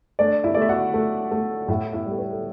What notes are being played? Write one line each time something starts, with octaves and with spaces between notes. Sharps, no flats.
A3 D4 D5
E4 E5
A3 D5
E5
F#4 F#5
A3
A3
A2 E4 E5
E4 E5
G3
A4
B4
A4